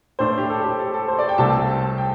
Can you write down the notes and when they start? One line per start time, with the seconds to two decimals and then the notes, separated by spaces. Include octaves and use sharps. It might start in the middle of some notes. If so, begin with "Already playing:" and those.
0.19 A2 A3 D4 C5
0.38 G4
0.49 A4
0.64 G4
0.79 A4
0.94 A4
1.08 C5
1.19 D5
1.29 G5
1.38 C2 C3 A3 C4 A5
1.98 G5